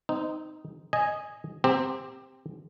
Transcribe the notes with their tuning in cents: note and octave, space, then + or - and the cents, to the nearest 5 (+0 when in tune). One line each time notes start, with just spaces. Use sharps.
C4 -20 D#4 +0
D#5 +0 G#5 +0
C4 +0 G4 +15 A#5 -25